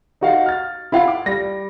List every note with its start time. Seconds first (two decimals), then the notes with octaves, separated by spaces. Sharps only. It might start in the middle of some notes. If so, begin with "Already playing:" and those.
0.21 D#4 F#4 F5
0.46 F6 A6
0.92 E4 F4 F5 F#5
1.08 D6
1.26 G3 A#6